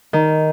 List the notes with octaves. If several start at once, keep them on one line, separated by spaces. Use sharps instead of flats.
D#3